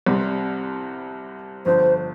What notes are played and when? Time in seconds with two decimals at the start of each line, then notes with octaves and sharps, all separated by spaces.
0.07 C2 C3 G3 C4
1.66 G1 F2 D3 C5